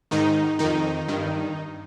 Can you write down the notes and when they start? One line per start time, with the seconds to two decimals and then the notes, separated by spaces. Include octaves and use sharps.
0.11 G#2 D#3 D#4
0.59 F2 D#3 D#4
1.08 G2 D#3